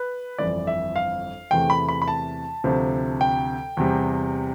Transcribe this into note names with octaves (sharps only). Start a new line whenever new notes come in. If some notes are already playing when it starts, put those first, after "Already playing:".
Already playing: B4
G1 F2 E3 D5
E5
F5
E2 C3 E3 A3 G5
B5
B5
B5
A5
D2 C3 F3
G5
E2 C3 G3